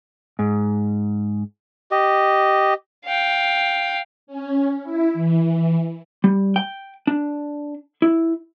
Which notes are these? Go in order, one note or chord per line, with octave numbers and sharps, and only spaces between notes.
G#2
G4 D#5
F5 G5
C#4
E4
E3
G3
G5
D4
E4